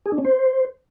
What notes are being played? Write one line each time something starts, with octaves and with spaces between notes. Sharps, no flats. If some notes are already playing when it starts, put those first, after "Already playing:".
G#4
D4
C#4
C5